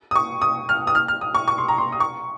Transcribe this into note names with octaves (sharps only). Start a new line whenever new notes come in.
D#6
C#6
D#6
F6
D#6
F6
F6
D#6
C#6
C#6
C6
A#5
C6
D#6
C#6